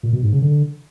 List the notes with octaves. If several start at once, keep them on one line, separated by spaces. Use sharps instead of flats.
A#2
B2
G#2
C#3
D3